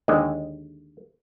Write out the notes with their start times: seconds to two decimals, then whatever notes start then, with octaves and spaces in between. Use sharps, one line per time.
0.08 D#2 D3 G#3